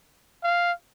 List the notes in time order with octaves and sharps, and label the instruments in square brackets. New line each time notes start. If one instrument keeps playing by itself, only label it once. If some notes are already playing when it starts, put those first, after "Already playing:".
[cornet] F5